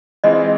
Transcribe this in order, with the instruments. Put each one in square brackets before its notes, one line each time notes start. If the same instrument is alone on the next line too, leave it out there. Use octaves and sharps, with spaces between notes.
[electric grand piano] E3 G#3 C4 F4 G#4 [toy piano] D#5